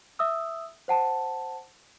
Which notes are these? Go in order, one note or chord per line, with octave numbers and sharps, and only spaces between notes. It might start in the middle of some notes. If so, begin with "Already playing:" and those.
E5 D#6 E6
C5 F#5 A5